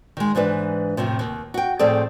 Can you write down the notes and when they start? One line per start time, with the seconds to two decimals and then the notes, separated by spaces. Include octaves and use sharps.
0.17 D#3 G#3
0.35 G#2 E3 D4 B4
0.97 F2 A2 C3 F3
1.19 D#2
1.54 F#4 G5
1.79 A2 F3 C4 G#4 A4 D5